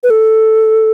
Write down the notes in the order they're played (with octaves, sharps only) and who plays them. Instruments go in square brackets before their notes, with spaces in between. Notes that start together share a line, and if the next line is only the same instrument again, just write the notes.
[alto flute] B4
A4